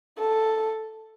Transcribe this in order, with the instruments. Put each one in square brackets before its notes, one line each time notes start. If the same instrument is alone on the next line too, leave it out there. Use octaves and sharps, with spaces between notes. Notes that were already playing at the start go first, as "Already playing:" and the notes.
[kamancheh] A4